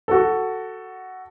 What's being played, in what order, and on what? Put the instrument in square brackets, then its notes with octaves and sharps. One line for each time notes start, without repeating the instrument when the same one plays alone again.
[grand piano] F#4 A4